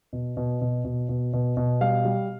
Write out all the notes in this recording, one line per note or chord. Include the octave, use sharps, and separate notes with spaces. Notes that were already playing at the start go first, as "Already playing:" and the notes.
B2
B2
B2
B2
B2
B2
B2
G3 F5
G3